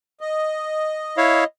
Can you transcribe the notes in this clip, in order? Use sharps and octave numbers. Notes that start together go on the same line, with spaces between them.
D#5
E4 C#5 F5